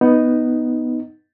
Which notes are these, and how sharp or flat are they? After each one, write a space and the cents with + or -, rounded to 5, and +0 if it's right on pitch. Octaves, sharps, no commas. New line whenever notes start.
B3 +0 D#4 +0